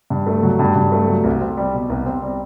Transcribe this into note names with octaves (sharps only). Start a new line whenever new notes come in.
G2
A3
F#3
G2
G2
A3
F#3
C2
C4
G3
B2
C2
C4
G3